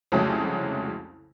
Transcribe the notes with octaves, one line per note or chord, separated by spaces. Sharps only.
C2 F2 C#3 F#3 G#3 A3